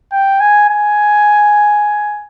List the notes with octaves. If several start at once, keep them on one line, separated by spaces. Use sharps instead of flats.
G5
G#5
G#5